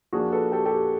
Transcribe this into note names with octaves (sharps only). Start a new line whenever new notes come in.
F3 A#3 D4 F#4 G#4
A4 B4
G4 A4
G4 A4